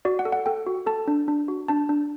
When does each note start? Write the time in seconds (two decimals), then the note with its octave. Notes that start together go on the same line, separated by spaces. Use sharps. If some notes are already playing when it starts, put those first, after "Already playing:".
0.05 F#4 D5
0.19 F#5
0.25 A4
0.32 F#5
0.46 A4 G5
0.67 F#4
0.86 A4 A5
1.08 D4
1.28 D4
1.48 F#4
1.68 D4 A5
1.89 D4